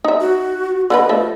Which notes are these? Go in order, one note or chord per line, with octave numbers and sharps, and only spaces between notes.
D#4 E5
F#4
D3 B3 B4 D#5
F3 A3 E5